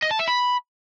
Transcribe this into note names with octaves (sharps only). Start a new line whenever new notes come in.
D#5
A5
E5
B5